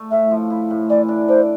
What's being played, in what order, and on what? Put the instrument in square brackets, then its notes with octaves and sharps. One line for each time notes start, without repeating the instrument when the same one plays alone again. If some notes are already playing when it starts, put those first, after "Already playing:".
Already playing: [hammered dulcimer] A3
[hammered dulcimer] A2 [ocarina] E5
[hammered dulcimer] F3
E4
A2
[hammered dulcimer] E3 [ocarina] D5
[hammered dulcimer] D4
[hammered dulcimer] D4 [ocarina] C5